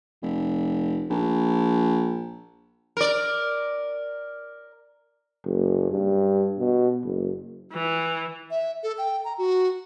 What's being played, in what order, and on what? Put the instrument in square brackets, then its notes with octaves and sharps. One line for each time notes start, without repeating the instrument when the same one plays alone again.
[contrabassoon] F1
A#1
[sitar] A#4 D5
[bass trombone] F#1
G2
B2
F#1
[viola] E3
[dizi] E5
A4
G5
A#5
F#4